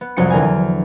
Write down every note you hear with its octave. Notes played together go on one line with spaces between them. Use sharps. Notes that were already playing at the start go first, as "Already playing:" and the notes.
B3
C2 F2 F#3 G5 C#7
E2 D3 A#4 G#5